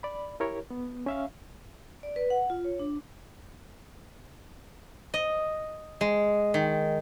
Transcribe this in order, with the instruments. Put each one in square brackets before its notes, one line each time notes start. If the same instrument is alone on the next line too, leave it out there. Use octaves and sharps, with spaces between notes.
[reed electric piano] D5 B5
E4 G4 A#4 C#5
B3
C#4 E5 F5
[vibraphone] D5
B4
F#5
F4
C#5
D4
[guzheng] D#5
G#3
D#3